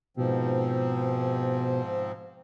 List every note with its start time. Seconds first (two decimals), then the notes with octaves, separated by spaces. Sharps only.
0.17 G#2 B2 F3 C4